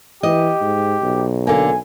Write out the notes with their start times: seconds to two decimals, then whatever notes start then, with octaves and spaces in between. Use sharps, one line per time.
0.23 E3 G4 D#5
0.61 G#2
1.02 B1
1.47 D3 A#3 G#5